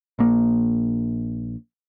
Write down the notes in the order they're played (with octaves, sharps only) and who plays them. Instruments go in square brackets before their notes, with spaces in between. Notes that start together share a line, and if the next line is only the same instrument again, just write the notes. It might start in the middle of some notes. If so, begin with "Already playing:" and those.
[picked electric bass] A#1 A#3